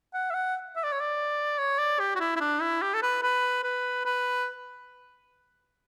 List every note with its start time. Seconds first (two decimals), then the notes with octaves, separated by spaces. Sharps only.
0.14 F#5
0.31 E5
0.34 F#5
0.76 E5
0.84 D5
0.92 C#5
1.00 D5
1.59 C#5
1.78 D5
2.00 G4
2.16 F#4
2.20 E4
2.36 E4
2.41 D4
2.61 E4
2.82 G4
2.94 A4
3.02 B4
3.23 B4
3.64 B4
4.05 B4